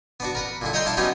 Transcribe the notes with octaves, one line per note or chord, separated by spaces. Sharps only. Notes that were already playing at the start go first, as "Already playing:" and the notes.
B3 D4 F#4
A#4 B4 F#5
A#2 D3 E4
C#5 D#5 E5 G5 A#5 C6
D4 E4 F5 A5
F#3 B3 C#4 D#4 F4 G4